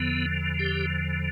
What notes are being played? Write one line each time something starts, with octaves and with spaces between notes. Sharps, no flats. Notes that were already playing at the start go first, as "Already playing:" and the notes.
Already playing: E2 D3 F3 B3
G4